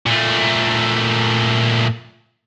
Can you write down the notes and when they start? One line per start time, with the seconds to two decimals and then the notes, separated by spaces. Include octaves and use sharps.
0.06 A#2 A3